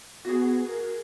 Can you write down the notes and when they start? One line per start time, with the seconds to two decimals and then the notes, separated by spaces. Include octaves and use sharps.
0.25 B3 F#4 G#4
0.67 A#4